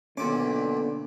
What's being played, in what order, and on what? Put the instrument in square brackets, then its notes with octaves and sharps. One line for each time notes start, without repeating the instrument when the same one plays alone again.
[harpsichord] B1 A#2 D6 [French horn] D3 [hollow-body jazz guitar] C#4